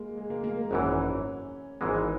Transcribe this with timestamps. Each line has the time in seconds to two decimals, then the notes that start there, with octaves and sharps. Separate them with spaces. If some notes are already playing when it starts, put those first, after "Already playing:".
Already playing: G#3 A#3
0.17 G#3
0.30 A#3
0.44 A#3
0.58 A#3
0.71 G#1 F#2 E3 C#4
1.81 G#1 G#2 E3 G#3 B3